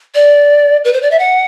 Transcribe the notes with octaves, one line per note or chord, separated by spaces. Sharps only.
D5
B4
C5
D5
E5
F#5